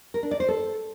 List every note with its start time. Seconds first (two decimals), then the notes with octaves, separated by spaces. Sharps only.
0.14 A#4
0.23 D4
0.31 D5
0.40 C5
0.49 A4